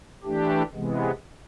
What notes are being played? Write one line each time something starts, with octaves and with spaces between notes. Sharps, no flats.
E3 A3 D4 G4
C3 E3 G#3 B3